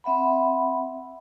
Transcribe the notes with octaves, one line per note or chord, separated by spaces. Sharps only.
C4 E5 F#5 B5